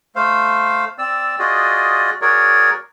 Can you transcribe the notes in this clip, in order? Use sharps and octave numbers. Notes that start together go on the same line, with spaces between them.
A3 C5 F5
C4 D5 E6
F4 F#4 G#4 D5 D#5
F#4 G#4 A#4 C#5 D5